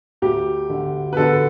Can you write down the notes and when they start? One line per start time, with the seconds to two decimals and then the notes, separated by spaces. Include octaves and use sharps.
0.22 D2 G4
0.70 D3
1.13 B4
1.17 D3 A4